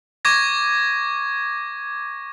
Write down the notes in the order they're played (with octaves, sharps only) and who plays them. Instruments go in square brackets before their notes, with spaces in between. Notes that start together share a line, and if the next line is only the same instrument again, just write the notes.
[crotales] C#6 D6 G#6 A#6